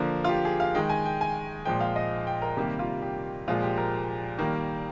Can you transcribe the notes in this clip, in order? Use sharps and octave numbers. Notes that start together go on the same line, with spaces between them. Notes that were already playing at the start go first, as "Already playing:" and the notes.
Already playing: D3 F3 A#3
F4
G4
G#4
F5
D#3 G#3 G5
G#5
G5
G#5
A#2 F3 G#3 G5
F5
D#5
G5
A#4
C3 D#3 G3 A#3 G4
F4
G4
A#2 F3 G#3 F4
G4
A#4
D#3 G3 A#3